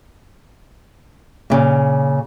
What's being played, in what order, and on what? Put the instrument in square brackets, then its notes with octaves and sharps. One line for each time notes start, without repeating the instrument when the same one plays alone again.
[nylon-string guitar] A#2 C#3